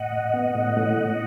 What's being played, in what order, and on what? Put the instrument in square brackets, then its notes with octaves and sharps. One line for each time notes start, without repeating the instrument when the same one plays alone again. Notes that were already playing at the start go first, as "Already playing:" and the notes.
Already playing: [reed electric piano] A2 [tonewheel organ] D#5 F#5
[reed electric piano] A2
B3
A2
A2
A2